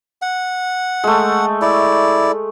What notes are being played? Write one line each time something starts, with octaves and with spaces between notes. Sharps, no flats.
F#5
G#3 A3
E4 D5